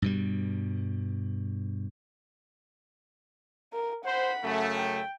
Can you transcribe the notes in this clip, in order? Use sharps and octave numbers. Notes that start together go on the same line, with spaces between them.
G2 B2 G3
A#4
C5 F#5 B5
F#2 C#3 A3
G5